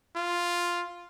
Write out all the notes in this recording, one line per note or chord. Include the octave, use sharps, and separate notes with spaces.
F4